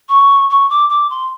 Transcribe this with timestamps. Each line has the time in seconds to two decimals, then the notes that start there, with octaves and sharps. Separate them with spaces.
0.09 C#6
0.50 C#6
0.70 D6
0.90 D6
1.10 C6